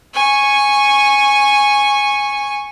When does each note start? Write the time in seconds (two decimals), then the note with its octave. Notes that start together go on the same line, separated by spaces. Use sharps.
0.14 G#5 C#6